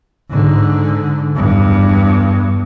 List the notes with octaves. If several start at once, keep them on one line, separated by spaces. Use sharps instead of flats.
G#2 D3
E2 G2